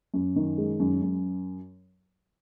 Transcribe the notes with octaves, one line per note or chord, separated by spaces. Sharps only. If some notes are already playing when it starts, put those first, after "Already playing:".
F#2
D#3
G#3
F#2
F#2